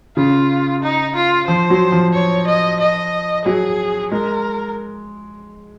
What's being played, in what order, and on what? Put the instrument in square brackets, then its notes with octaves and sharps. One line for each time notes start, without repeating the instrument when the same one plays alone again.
[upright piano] C#3 [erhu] F4
[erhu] D#4
F4
[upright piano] F3 [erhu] C5
[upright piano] F#3
F3
[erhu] C#5
D#5
D#5
[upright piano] F#3 [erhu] G#4
[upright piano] G#3 [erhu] A#4